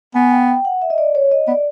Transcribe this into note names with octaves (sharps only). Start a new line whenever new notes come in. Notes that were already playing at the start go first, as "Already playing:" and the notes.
B3 G#5
G5
G5
F#5
E5
D#5
D5
C#5
D#5
B3 D5